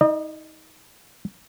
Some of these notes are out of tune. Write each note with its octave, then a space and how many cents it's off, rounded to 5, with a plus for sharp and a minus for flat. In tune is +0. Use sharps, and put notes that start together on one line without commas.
D#4 +30 D#5 -40